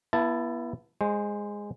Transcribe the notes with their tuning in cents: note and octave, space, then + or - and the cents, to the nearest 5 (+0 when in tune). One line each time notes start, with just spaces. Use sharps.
B3 -30 E4 +20 A5 +0
G#3 -10 C5 +10